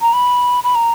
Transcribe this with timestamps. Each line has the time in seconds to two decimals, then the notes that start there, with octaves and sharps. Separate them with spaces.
0.01 A#5
0.13 B5
0.64 B5
0.75 A#5